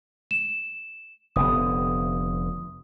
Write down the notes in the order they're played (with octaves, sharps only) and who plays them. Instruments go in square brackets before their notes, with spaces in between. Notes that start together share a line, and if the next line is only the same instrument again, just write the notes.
[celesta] E7
[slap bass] F1 D3 B3 [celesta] D#6